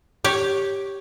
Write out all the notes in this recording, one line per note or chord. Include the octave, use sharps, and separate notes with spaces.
G4 C#5